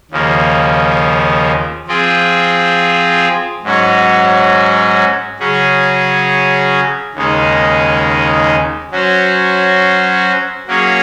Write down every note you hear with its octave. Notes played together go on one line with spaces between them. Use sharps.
D#2 C#3 F3 A#3
F3 C4 F4 G#4
G#2 F#3 C#4 F#4
C#3 F#3 C#4 G#4
D#2 C#3 G#3 D#4
F#3 C#4 F#4 C5
F#3 A#3 C#4 G#4 C#5